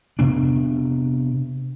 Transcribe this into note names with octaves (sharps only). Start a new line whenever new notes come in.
C3 B3 D4